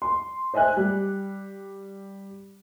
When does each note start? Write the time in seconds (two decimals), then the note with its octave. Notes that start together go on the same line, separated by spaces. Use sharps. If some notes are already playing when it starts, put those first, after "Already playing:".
0.02 C6
0.54 C5 D#5 E5 G#5 F#6
0.77 G3